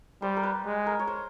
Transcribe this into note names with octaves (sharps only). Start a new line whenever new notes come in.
G3 C5
A#4
B4
G#3
A#4
C#5
C5